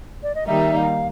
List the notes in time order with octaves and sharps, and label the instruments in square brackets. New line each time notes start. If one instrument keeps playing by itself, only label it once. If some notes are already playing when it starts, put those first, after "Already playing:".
[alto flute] D5
D#5
[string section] D#3 G3 A#3 D#4 [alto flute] E5
[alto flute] F5